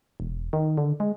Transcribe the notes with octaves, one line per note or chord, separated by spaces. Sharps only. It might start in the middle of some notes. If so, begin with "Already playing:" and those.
E1
D#3
D3
G#3